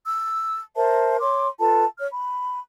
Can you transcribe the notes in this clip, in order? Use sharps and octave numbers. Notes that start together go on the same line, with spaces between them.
E6
A#4 C5 E5 A5
C#5 C6 D6
F4 A4 B4 A5
C#5 F6
B5